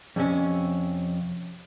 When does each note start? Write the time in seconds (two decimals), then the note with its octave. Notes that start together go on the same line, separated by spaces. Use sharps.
0.16 F2 C3 C#4